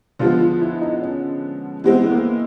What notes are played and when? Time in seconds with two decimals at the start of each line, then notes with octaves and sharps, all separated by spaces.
0.19 D3 F3 G#3 B3 F4
0.41 F4
0.61 E4
0.81 D#4
1.02 C#4
1.84 E3 G#3 B3 C4 E4
2.04 B3
2.12 A#3